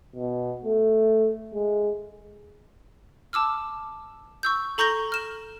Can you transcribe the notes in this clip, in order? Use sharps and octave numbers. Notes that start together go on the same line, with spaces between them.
B2
A3
G#3
A5 D6 E6 F6
C#6 E6 G6
A4 A#5 C#6 G6 A#6 G7
F6 E7